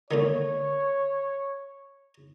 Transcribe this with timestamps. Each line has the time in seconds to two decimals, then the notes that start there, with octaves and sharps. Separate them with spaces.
0.11 A#2 D3 D#3 C#5